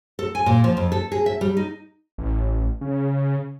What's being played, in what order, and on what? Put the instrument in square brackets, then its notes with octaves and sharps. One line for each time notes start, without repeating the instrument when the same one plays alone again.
[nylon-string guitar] A4
G#5
A#2
F3
F2
A4
G#4
E5
G3
D#4
[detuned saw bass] A1
C#3